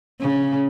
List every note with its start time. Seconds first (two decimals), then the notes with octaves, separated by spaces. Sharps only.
0.21 C#3